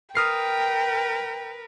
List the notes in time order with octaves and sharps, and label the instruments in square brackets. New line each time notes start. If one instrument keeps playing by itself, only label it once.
[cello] A#4 B4 [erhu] G5 [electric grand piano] D#6 F6 C7